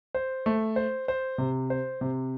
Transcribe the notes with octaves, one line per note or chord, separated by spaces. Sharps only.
C5
A3
C5
C5
C3
C5
C3